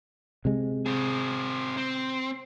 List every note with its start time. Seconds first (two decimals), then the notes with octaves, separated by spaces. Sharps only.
0.45 C3 G#3
0.86 C4 G#4
1.77 C4